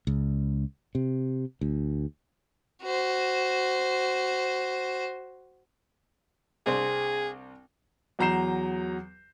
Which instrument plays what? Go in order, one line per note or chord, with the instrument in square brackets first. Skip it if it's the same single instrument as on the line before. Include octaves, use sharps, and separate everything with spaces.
[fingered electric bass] C#2
C3
D2
[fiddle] F#4 C5
[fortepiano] C2 C4 D4 [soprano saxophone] G#4
[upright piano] E2 F#3 A#5 G6 C7 E7